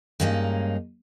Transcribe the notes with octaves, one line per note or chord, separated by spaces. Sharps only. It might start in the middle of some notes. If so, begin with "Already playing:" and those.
G2 G#3 A#3 C#4 D#4